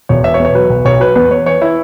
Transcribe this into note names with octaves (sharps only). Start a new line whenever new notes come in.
E1 C#5
E3 E5
C#5
E2
C#5
F#3 B4
B1
B1 C#5
F#3 B4
E2 B4
E2 C#5
E3 C#5
E3 E4